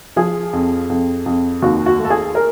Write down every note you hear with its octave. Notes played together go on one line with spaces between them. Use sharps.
F3 G#4
F2
F2
F2
D#2 F#4
F#4
A3
A4
G#4
A#4